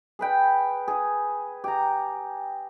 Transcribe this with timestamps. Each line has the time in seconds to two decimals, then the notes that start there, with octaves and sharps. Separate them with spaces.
0.19 G#4 B4 G5
0.88 G#4
1.64 G4 A#5